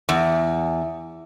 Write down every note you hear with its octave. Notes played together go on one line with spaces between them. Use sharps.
E2